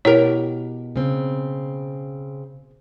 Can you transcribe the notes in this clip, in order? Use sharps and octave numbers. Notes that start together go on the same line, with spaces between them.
B2 E4 G4 A#4 C#5
C#3 C4